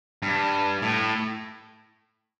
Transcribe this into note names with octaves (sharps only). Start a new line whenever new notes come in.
G2
A2